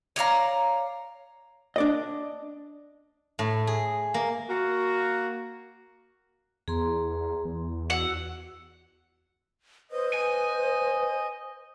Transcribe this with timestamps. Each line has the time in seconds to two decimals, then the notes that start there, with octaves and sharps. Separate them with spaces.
0.16 C#5 D5 F5 A#5
1.76 D4 D5 D#5
3.39 A2
3.67 G#4
4.14 A#3
4.49 A#3 F#4
6.68 E2 G#4 A#5 C6
7.45 E2
7.90 F#4 F#5 E6
9.91 B4 C5 D#5
10.13 G#5